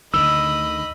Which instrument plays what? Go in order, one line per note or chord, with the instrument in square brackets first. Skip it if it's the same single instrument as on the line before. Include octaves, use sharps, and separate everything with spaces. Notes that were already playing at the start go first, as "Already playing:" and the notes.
[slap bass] D2 D3 D#3 [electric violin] D#5 B5 [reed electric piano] E6